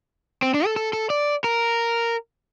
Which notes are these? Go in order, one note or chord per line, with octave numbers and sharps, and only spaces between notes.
C4
D4
A4
A4
A4
D5
A#4